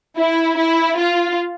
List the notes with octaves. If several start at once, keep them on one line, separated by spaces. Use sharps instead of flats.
E4
E4
F4